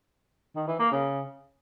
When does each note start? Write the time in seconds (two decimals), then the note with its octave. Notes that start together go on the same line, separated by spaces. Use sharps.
0.56 D#3
0.68 E3
0.79 A#3
0.91 C#3